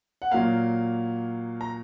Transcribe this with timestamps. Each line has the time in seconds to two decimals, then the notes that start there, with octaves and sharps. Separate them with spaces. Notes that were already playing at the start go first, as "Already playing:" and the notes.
0.22 F#5
0.31 A#2 F#3 A#3 F5
1.61 A#5